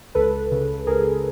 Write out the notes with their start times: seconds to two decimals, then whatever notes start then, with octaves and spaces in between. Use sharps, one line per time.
0.15 C#2 A4 B4
0.52 C#3
0.87 C#2 G#4 A#4